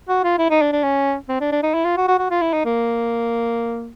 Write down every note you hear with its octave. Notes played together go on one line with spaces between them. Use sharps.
F#4
F4
E4
D#4
D4
D4
C#4
C4
D4
D4
D#4
E4
F4
F#4
F#4
F#4
F4
E4
D#4
A#3